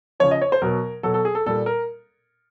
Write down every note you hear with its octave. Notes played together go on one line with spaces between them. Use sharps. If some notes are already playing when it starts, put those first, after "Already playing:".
C#3 F3 C#5
D#5
C#5
C5
B2 F#3 A#4
B2 F#3 A4
A4
G#4
A4
A#2 G3 A4
A#4